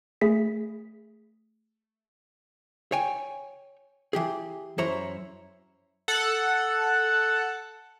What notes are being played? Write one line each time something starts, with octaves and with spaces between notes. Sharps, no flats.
A3 G#4 B6
C#5 G5 G#5
E3 G4 G#4
F#2 E4 C5 C#5 A#5
A4 F#5